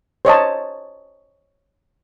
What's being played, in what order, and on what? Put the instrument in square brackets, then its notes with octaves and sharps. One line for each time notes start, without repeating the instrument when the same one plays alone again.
[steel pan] C5 C#5 D#5 A5